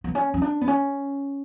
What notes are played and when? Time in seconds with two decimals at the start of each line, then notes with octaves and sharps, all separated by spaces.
0.04 B3
0.15 C#4
0.34 C#4
0.42 D4
0.61 B3
0.68 C#4